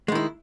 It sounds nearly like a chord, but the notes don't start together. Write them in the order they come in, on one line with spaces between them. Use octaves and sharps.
G#3 D#3 E4